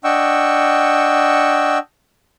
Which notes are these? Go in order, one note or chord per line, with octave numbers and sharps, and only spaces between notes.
D4 D#5 F#5 G5 C#6 E6